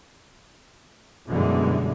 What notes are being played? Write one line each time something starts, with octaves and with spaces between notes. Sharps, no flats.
F#2 B2 D3 E3 G3 G#3